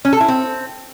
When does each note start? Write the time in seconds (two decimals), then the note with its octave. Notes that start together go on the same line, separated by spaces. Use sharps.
0.05 C#4
0.13 A4
0.21 E4
0.28 C4